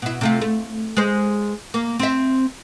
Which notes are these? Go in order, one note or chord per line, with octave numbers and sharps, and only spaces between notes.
B2 E4
C3 A3 F4
A3
G#3 C5
A#3
C4 E5